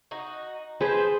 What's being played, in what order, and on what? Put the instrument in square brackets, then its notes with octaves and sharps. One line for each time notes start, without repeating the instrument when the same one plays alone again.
[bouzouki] D#4 F#4
[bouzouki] F3 B4 C5 [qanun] G#4